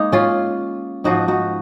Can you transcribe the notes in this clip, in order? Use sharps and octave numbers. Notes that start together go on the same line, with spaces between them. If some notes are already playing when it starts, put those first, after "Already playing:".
Already playing: G#3 A#3 D#4
C#4 F4
G#2 F3 D#4 F#4
D#4 F#4